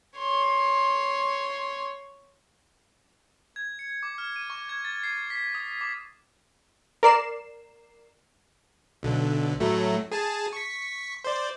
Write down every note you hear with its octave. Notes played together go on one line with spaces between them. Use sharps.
C#5 C6
G#6
C#7
D6
F6
D#7
C#6
G#6
A6
C7
B6
D#6
D6
A#4 D5 C7 E7
B1 D3
A2 F#3 A3
G#4 G#5 A5
C#6 B6
C5 D5